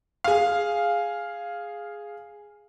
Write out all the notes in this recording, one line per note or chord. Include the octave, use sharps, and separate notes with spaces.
G#4 F5